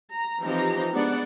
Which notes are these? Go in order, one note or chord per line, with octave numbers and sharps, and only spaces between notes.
A#5
E3 F3 C4 D#4 G4 A#5
G#3 B3 D4 D5 F#5